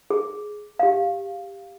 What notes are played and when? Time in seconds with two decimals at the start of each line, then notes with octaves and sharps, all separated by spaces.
0.10 G#4
0.79 G4 F5